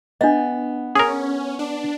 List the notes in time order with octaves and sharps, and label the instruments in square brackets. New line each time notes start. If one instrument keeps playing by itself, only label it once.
[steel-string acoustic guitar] B3 [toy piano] D4 D#5
[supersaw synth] C#4 [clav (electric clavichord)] G#4 A#4
[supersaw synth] D4